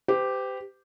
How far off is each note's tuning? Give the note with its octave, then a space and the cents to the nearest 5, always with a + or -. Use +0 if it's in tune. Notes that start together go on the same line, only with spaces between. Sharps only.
G4 +0 C5 -45